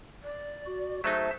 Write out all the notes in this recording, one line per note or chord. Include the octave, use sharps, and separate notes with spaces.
D5
F#4
F#3 A3 D#4 G#4 C5 E5 A5